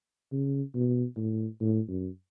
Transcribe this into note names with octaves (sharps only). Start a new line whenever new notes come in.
C#3
B2
A2
A2
F#2